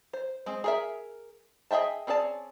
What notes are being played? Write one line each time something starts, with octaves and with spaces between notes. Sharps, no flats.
C5
G#3 C4
G#4 A#4 E5
G#4 D#5 E5 G5 A5
C4 C#4 G#4 D5 A5